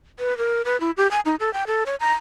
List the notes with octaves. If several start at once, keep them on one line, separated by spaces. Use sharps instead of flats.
B4
A#4
B4
E4
G4
G#5
D#4
A4
G5
A4
C#5
A#5